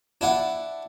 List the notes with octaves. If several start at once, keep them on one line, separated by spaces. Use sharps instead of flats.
D4 E4 F#5